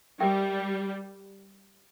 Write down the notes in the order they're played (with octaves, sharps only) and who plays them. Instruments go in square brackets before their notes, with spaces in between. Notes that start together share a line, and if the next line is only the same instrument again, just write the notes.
[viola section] G3 [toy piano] G4 A#4 E5 G5